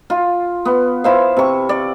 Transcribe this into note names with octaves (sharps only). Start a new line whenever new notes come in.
F4
B3
E4 C5 F5
C3 C#6
D5